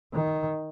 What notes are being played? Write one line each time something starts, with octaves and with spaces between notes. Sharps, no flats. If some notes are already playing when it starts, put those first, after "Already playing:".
D#3